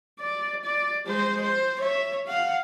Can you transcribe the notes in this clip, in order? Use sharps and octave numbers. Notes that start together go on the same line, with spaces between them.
D5
D5
G#3 C5
C5
C#5 E5
F5 F#5